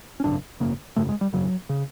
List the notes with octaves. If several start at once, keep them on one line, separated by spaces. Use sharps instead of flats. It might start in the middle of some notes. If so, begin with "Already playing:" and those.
C#4
G#1 F#2 C#3 D4
G#1 F#2 C#3 A#3
G#1 F#2 C#3 A3
G#3
G3
G#1 F#2 C#3 F#3
C#3